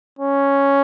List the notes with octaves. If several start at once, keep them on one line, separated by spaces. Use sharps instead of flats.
C#4